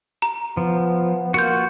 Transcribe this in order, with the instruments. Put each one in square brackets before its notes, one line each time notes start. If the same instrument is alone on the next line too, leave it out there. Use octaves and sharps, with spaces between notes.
[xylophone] A#5
[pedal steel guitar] F3 [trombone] B3
[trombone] A#3 [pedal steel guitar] F4 F#4 [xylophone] G6 C#7